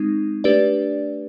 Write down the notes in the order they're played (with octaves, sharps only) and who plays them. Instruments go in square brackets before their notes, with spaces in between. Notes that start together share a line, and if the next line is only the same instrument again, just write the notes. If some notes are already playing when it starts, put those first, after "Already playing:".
Already playing: [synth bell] G#3 C4 D#4
A3 D4 G4 B4 D5